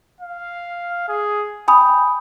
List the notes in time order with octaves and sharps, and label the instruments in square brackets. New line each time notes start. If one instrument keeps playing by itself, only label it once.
[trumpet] F5
G#4
[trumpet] G5 [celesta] G#5 B5 D#6